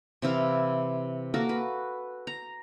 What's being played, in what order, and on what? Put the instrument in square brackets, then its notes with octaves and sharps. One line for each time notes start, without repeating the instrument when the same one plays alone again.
[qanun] C3 E3 E4 F5
A#3 F#4 A4 A#4
B4
A#5